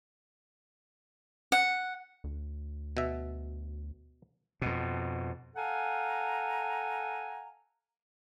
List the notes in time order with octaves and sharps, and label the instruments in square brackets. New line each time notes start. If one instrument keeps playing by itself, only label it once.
[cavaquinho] F#5
[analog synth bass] D2
[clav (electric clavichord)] B2 E5
[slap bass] F2 B2
[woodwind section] A4 F5 F#5 G#5 A#5